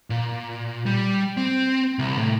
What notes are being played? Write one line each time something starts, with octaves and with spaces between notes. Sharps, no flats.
A#2
G3
C4
C2
A2